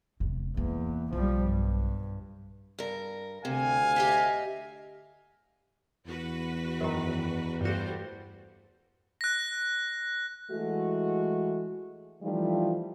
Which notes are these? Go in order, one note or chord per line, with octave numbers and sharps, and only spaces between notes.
E1 C3
E2 A#3
B1 B2 F3 G3
G2
G2 A#4
D2 C3 F5 G#5
G4 D#5 E5
E2 F#4 B4
F#2 D#3
G2 G3 A3 F#4 C5
F#6 A#6
E3 G#3 A3 F#4
E3 F3 G3 A3 D#4 F4